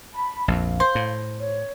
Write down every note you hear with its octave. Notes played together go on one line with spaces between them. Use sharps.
A5 B5
A#1 F2 F5
C5
A2
C#5